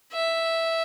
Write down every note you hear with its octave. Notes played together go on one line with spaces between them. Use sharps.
E5